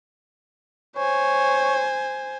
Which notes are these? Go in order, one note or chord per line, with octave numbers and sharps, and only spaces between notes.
C5 C#5 G#5